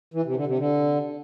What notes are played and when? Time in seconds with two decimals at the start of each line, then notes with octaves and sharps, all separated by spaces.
0.14 E3
0.25 C3
0.36 D3
0.47 C3
0.58 D3